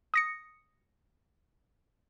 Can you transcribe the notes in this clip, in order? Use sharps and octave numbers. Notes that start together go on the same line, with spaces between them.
D#6 A#6 C#7